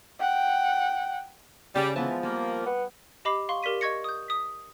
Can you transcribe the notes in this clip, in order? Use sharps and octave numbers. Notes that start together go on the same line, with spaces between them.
F#5 G5
C#3 G3
E3 F3 G#3 B3 A5
G3 A#3
B3
G4 D#5 B5 D6 C7
F5 C6 C#6
G4 A#4 D5 B6 D#7
D#5 C#6 G#6 A#6 C#7
D#6 G6
D#6 B6